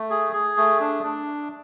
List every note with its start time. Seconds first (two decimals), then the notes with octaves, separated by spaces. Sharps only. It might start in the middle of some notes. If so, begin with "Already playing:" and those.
Already playing: A3
0.10 G#4
0.33 G#4
0.57 A3
0.80 D4
1.03 D4